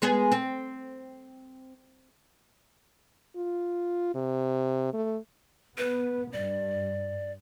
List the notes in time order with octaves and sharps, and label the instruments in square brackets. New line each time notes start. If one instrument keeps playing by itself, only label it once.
[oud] G#3 B3 G#4
C4
[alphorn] F4
C3
A3
[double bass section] B3 [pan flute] B4
[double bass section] G2 [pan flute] D5